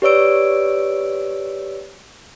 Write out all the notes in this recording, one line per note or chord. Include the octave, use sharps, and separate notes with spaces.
G4 B4 C#5 D5 E6 D7